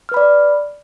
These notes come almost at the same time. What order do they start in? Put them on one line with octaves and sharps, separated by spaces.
F6 B4 B5 D5